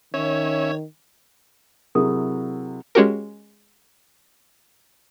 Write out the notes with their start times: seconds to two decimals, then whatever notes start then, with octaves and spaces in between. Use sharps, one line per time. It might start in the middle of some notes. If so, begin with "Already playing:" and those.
0.14 D#3 C#4 C#5 E5
1.95 C3 F#3 E4 G#4 A#4 D#6
2.95 G#3 C#4 F#4 G4 A#4